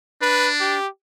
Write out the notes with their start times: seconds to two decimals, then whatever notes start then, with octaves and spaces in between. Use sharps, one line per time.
0.21 D4 B4
0.60 G4